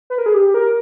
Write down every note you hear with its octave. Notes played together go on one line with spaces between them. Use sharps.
B4
A#4
G#4
G4
A#4